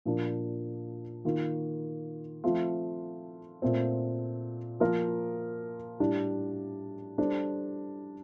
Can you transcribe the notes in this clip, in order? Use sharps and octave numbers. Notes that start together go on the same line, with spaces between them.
A#2 F3 A#3 D4
D#3 A#3 F4
F3 A3 C4 F4
A#2 A3 C4
F3 A#3 F4 A#4
A2 G3 D4
G3 D4 A4 C5